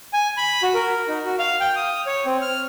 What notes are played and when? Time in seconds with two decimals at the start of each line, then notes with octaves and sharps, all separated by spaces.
0.13 G#5
0.37 B5
0.63 F#4
0.74 A#4
1.08 D#4
1.25 F#4
1.39 F5
1.60 G5
1.76 D#6
2.06 C#5
2.26 C4
2.42 F6